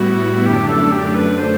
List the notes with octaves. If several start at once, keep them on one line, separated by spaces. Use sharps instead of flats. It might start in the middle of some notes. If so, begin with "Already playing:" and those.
Already playing: A2 G3 B3 E4 F#4
F#2 D3 A3 D4 G4
A4
G4
B4
C5